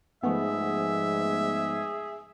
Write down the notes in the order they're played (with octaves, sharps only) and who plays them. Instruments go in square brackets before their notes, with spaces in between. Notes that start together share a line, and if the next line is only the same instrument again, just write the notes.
[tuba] G#2 [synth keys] F3 A3 B3 [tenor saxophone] G#4 [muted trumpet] E5